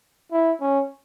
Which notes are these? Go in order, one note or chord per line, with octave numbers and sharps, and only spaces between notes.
E4
C#4